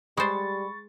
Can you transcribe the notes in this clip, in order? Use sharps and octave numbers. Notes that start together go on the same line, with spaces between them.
G3 G#3 C5 B5 C#6 A6